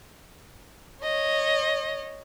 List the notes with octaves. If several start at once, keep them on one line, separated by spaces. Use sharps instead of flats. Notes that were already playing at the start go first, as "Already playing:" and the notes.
C#5 D#5